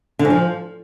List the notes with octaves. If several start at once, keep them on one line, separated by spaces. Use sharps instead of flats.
D3
G#2
F3